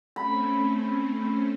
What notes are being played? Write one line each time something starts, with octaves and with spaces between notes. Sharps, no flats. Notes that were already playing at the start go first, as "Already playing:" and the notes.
A3 C4 C#4 B5